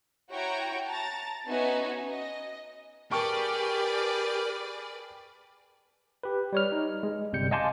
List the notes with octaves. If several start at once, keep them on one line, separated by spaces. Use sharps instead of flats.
E4 F#4 C#5 G5 A#5 C#6
A5 A#5 A6
B3 C#4 D#4 F#4 E5 G#5
D#5
G4 G#4 A#4 B4 D5 G5 A5 C#6
G4 B4
G3 C#5 F6
D#4
G#3
G1 C3 G3 G6 C#7
D#5 F5 G#5 A5 C6 D6